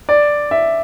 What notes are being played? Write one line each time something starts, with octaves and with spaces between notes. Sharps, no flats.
D5
E5